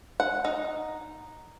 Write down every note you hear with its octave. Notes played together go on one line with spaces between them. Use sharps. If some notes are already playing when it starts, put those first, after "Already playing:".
F#5
D#4